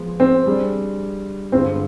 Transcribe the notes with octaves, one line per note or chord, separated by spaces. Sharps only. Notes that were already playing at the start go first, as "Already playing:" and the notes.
Already playing: F3 G#3 B3
C4
G3 D4 G#4 D5
G2 D3 G#3 B3 C4 F4